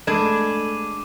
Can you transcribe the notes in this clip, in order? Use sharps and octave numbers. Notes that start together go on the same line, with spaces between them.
G#3 A3 D4 B5 D6 G#6 D#7 E7